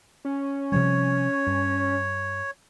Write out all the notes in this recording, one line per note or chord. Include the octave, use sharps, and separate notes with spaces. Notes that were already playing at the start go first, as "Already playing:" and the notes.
C#4
C3 F3 G3 C#5
G2